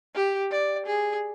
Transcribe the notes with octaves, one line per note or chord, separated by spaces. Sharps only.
G4
D5
G#4